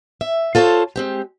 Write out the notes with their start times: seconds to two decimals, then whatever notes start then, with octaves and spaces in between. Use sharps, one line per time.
0.21 E5
0.55 F4 A4 C5 C#5 A5
0.96 G#3 C4 G4